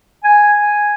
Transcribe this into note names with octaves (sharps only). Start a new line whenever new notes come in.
G#5